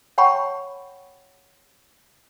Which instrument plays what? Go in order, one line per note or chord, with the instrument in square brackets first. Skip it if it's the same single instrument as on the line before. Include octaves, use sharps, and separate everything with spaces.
[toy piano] C#5 F#5 G5 A5 B5 C#6